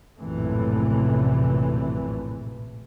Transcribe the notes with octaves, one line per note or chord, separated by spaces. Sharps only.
A#1 F#2 A2 C3 E3 A3